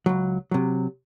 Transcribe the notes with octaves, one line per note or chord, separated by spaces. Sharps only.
C#2 F#3
C3 F#3